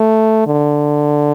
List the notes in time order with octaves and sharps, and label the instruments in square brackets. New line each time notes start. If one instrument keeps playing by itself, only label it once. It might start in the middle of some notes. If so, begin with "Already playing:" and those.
Already playing: [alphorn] A3
D3